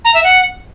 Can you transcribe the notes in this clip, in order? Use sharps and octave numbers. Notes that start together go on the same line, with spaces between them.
A#5
E5
F#5